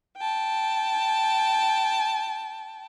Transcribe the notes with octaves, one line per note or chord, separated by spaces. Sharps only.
G5 A5